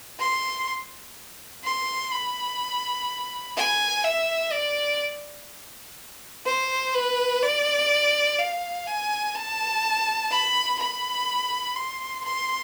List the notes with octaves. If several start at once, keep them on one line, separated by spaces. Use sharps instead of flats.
C6
C6
B5
G#5
E5
D5
C5
B4
D5
F5
G#5
A5
B5
B5
C6
C6